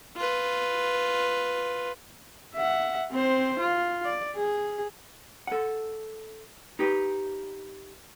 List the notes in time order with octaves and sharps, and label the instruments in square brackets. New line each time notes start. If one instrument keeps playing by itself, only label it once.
[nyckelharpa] F4 B4
[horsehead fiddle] E5 F#5
C4 C5
F4
D5
G#4
[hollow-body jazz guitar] A4 F#5
D#4 G4 B4